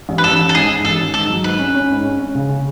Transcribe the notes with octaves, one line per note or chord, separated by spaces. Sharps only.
A1
B4
A1 A4
A1
A4
G#2 G#4
G#2
A1 A4
D#3
G#2 A4
F#3
G#2 B4
C#4
C#4
G#2
C#4
C#4
C#3
C#3